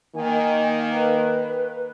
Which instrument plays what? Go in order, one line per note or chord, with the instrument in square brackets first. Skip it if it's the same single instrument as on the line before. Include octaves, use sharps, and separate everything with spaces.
[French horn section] D#3 A#3 [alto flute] G#5
[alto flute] B4